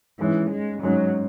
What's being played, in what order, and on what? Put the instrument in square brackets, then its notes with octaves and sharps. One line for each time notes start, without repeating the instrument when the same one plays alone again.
[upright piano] G#2 G#3 C#4 [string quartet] E3
[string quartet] G#3
[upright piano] G#2 G#3 C#4 [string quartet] F#3